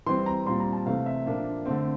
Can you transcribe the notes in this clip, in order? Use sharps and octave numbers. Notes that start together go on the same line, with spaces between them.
E3 G3 C4 C6
A#5
A#2 G3 C4 C6
A#5
A5
C3 E3 A3 C4 F5
E5
A#2 F3 A#3 D4
D3 A3 C4